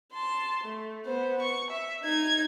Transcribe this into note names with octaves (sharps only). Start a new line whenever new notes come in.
A5 C6
A3
B3 C5
C#6
E5
D#4 G#6